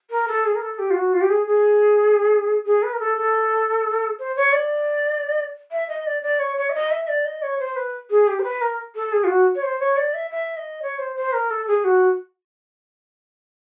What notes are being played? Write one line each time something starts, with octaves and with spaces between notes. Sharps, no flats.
A#4
A4
G#4
A#4
A4
G4
F4
F#4
F4
G4
G#4
G#4
G#4
B4
A#4
A4
A4
C5
C#5
D5
E5
D#5
D5
D5
C#5
C#5
E5
D#5
E5
D5
D#5
C#5
C5
B4
G#4
G4
C5
B4
A#4
A4
G#4
F4
F#4
C#5
C5
C#5
D5
E5
E5
D#5
C#5
C5
C5
A#4
A4
G#4
F#4